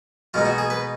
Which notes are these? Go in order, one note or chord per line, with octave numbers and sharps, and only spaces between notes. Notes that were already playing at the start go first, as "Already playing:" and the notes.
B2 G#3 D#4 F4
F#4
G#4
B4